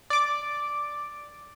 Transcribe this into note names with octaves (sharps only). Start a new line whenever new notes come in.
D5 D6